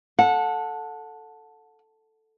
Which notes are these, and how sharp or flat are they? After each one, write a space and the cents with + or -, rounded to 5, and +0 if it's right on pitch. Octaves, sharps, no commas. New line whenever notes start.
A4 +0 F#5 -25